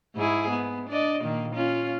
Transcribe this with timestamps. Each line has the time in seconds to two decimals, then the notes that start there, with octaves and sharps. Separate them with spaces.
0.15 G#2 E4 G#4
0.50 B3
0.89 D4 D5 D#5
1.21 A#2 D#3 A#3
1.55 C#4 F4